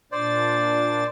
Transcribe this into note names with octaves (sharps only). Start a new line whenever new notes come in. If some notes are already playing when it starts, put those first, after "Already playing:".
A#2 D4 C5 D5 A6